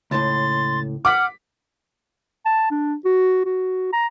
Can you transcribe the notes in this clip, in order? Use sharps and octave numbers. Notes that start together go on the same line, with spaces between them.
C#2 A2 C6 A6
F#5 D6 F6 B6
A5
D4
F#4
F#4
A#5